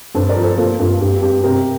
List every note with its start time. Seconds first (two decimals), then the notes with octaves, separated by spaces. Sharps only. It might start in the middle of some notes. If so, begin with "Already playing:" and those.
0.15 G2 A4 C5
0.29 A#4 D5
0.36 F3
0.43 A4 C5
0.58 A#3 F4 A4
0.79 G2 F4 A4
1.01 G2 G4
1.22 G2 G4
1.44 C3 G4 A#4